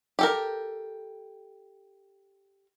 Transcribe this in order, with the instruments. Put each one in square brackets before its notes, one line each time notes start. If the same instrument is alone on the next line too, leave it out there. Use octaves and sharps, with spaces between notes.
[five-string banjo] G4 A4 A#4